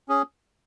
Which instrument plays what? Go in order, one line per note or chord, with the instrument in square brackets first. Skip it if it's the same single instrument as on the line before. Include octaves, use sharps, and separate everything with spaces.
[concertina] C#4 G#4